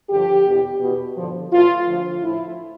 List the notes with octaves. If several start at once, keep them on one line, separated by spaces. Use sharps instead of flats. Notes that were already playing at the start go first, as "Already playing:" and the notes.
G2 D3 F3 G4
E2 B2
E2 B2
G2 D3 F3
A2 E3 F4
D2 D3 F3
A2 F3 E4